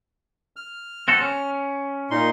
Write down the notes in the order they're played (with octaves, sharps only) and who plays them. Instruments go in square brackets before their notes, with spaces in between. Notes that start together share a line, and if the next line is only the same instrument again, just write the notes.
[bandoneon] F6
[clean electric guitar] C4 F#4 A4
C#4
[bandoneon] A#2 D#4 C6